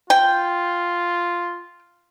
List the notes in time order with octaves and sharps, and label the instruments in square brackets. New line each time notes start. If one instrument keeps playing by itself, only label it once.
[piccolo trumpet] F4 [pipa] G5